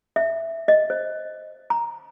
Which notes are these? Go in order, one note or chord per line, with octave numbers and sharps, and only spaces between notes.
E5
D#5
C5
A#5